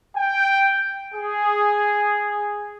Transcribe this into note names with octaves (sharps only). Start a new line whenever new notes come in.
G5
G#4